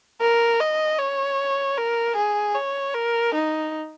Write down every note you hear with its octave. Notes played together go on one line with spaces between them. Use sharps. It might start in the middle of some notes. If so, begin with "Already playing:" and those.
A#4
D#5
C#5
A#4
G#4
C#5
A#4
D#4